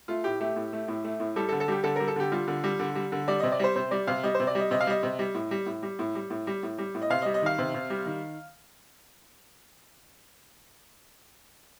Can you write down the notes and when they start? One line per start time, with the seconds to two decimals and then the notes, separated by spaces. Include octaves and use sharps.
0.08 A3 F4
0.24 A2 G4
0.40 A3 G4
0.56 A2
0.73 A3
0.88 A2
1.04 A3
1.20 A2
1.36 G3 A4
1.49 A4
1.52 D3
1.60 A4
1.68 G3 G4
1.84 D3 A4
1.96 G3 A#4
2.08 A4
2.16 D3 G4
2.32 G3 F4
2.48 D3
2.64 G3
2.79 D3
2.95 G3
3.12 D3
3.28 G3 D5
3.40 C3 D#5
3.52 D5
3.59 G3 C5
3.76 C3 C5
3.91 G3 D5
4.07 C3 F5
4.23 G3 D#5
4.35 C5
4.40 C3
4.47 D5
4.55 G3 D#5
4.71 C3 D#5
4.81 F5
4.87 G3 D#5
5.03 C3
5.19 G3
5.35 A2
5.51 G3
5.66 A2
5.83 G3
5.99 A2
6.15 G3
6.30 A2
6.47 G3
6.63 A2
6.78 G3
6.95 A2
7.02 D#5
7.10 C3 F5
7.22 D#5
7.26 G3
7.34 D#5
7.42 D#3 F5
7.58 C3
7.74 C3
7.90 G3
8.06 D#3